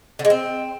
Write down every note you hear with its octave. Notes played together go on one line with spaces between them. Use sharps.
D3
G#3
C4